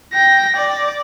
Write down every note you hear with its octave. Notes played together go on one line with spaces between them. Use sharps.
G5 A#6
D5